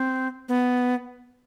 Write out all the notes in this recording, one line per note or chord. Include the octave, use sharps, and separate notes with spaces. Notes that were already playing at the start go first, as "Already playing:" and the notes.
Already playing: C4
B3